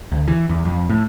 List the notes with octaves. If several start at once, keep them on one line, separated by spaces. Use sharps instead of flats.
D2
E3
E2
F2
A2